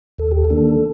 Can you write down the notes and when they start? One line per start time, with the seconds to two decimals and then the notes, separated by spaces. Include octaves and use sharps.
0.18 D#2 A4
0.31 G4
0.45 A4
0.50 D#3 A#3 D4